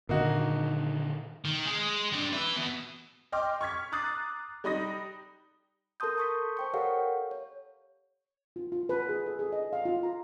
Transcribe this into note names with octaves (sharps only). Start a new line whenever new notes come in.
A#2 D3 D#3 A#3 D#4 F#4
D#3
G#3 G#4
G3 D4
B4 E5
B2
D#5 G5 C6 D6 F6
C#6 F6 G#6 B6
A#5 D6 D#6 F#6 A6 C7
G3 D#4 B5 D#6 A#6
A4 A#4 A5 C6 D#6 G6
A5 C6 C#6 D#6 G6 B6
C5 G5 C#6
G4 A4 A#4 C#5 F5 F#5
C#5
F4
F4
B4
G#4
A4
G#4
D#5
F5
F4
A#5